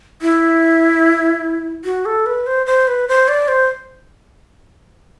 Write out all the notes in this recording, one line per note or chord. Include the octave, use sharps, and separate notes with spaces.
E4
F#4
A4
B4
C5
C5
B4
C5
D5
C5